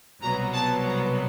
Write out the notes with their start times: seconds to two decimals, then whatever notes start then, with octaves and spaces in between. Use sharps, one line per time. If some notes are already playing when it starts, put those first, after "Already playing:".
0.22 C2 B2 F#3 B3 A#5
0.53 A5
0.85 A#5